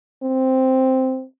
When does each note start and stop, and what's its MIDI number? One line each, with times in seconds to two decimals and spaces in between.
0.23 1.24 60